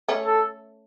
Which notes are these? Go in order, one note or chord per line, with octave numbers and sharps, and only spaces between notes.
A3 C#4
A4